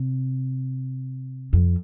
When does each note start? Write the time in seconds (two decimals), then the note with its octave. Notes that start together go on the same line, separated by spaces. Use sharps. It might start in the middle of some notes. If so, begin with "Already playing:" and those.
Already playing: C3
1.53 F2